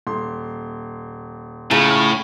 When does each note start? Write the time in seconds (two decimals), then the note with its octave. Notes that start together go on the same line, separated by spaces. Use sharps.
0.07 D#1 C6
1.71 A2 C#3 F4 A#5 B5
1.91 C#6 F6